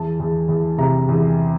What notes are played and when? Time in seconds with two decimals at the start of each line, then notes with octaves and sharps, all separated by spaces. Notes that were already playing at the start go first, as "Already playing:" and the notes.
Already playing: E2 A5
0.20 E2
0.48 E2
0.78 C3 A#5
1.09 E2